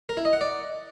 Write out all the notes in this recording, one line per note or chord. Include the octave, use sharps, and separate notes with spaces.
A#4
E4
D#5
F#5
D5